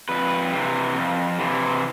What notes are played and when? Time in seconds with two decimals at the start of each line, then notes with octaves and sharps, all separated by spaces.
0.09 F2 B4
0.53 C3 E3
0.95 F2
1.39 C3 E3